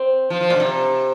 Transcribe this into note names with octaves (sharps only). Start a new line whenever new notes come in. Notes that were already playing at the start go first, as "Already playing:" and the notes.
Already playing: C4
F3
F3
A#2
D3
C3